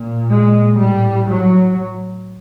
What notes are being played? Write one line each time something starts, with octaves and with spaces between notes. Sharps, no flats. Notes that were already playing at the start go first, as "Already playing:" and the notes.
Already playing: A#2
G#3
A2 G3
F#3